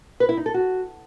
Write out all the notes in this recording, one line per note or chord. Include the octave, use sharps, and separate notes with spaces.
B4
E4
D#4
A4
F#4